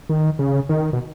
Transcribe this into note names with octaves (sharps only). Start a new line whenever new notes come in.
D#3
C#3
D#3
B2